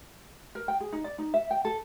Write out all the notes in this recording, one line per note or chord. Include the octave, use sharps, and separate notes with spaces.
A#4
G5
G#4
D#4
D5
D#4
E5
G5
A4